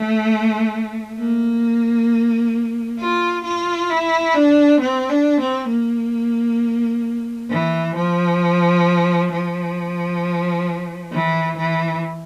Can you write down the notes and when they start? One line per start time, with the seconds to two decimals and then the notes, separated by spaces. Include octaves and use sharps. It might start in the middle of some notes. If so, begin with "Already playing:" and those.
Already playing: A3
1.19 A#3
2.99 F4
3.44 F4
3.90 E4
4.35 D4
4.80 C4
5.09 D4
5.40 C4
5.70 A#3
7.50 E3
7.96 F3
9.32 F3
11.12 E3
11.57 E3